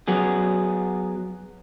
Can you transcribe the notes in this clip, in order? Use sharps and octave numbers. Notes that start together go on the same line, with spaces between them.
F#3 B3 G#4